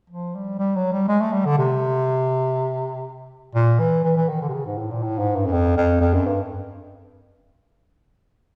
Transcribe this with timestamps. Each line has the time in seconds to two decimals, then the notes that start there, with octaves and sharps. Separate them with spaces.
0.10 F3
0.35 G3
0.59 G3
0.76 F#3
0.92 G3
1.08 G#3
1.21 A3
1.33 G3
1.45 D3
1.58 C3
3.55 A#2
3.80 E3
4.04 E3
4.17 E3
4.29 D#3
4.42 D3
4.49 C3
4.53 C#3
4.66 G#2
4.78 A2
4.91 A#2
5.03 A2
5.19 G#2
5.36 G2
5.46 F#2
5.52 F2
5.77 F2
6.01 F2
6.14 F#2
6.27 G2